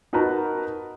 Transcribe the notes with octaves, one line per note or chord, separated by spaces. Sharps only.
D#4 F#4 A#4 B4 A5 A#5